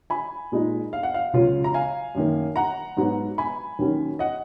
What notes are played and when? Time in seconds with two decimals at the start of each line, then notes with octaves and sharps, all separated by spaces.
0.10 G#5 B5
0.52 A#2 G#3 D#4
0.93 F5
1.03 F#5
1.14 F5
1.33 C#2 C#3 F#3 C#4 F4
1.64 A#5
1.74 F5 G#5
2.15 F#2 D#3 A#3
2.56 F#5 A#5
2.97 G#2 F#3 B3
3.38 G#5 B5
3.79 D#2 D#3 F#3 C#4
4.19 D#5 F#5